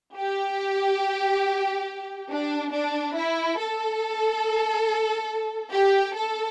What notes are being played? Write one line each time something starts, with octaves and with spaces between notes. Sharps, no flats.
G4
D4
D4
E4
A4
G4
A4